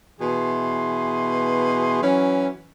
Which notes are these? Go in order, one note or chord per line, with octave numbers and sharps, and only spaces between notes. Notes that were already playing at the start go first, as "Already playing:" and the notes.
B2 E3 G#4 C6
E3 F#3 C#4